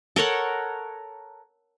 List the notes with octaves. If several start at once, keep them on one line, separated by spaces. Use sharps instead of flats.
A4 A#4 C#5 F#5